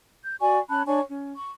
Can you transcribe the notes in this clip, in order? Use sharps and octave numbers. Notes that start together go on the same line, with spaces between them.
G6
F#4 D5 G#5 C#6
C#4 A5 B5 F#6
D4 C#5 G#5 C#6
C#4
C#6